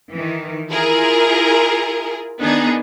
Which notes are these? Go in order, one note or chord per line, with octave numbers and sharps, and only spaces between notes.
D#3 E3
E4 F4 G#4 A#4
D#3 B3 D4 D#4 G#4